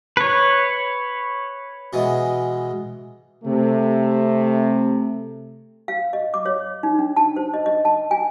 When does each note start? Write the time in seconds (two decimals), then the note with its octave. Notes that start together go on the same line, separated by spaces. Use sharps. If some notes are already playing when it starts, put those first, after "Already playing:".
0.17 B4 C#5
1.93 B2 E3 G#3
3.44 C3 A3
5.88 F5
6.13 D#5
6.34 D6
6.46 C#5
6.83 D#4
6.99 D4
7.16 A5
7.36 C5
7.54 D#5
7.66 D#5
7.85 A5
8.11 G#5